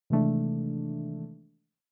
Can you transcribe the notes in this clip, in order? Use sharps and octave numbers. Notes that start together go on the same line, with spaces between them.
C3 D#3 E3 G#3 A3 D4